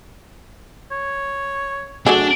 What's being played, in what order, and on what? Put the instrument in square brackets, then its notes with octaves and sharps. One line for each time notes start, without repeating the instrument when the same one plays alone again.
[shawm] C#5
[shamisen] F#3 A3 G#4 [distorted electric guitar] D4